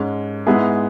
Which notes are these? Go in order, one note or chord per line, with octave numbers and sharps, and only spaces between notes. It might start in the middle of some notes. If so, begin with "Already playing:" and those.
Already playing: G#2 G#3 C#4
G#2 G#3 B3 E4 G#4